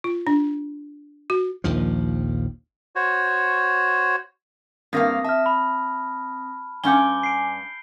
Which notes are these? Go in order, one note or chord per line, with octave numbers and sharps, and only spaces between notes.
F4
D4
F#4
A#1 D#2 F3
F#4 C5 C#5
G2 A#3 C4 F5 D#6 A#6
E5 A5 F6
B5
G2 C#4 F#5 G#5 D6 G6 G7
C7 D7